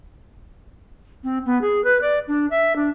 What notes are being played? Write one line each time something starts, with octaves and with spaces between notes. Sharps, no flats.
C4
B3
G#4
B4
D5
D4
E5
D4